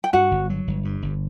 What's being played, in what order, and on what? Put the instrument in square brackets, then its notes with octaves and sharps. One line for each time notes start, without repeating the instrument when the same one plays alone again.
[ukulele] G5
[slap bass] G2 [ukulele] F#4 F#5
[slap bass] G1
F#3
G1
G2
G1